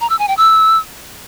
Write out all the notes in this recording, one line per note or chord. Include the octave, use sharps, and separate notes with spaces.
A#5
E6
G#5
G5
E6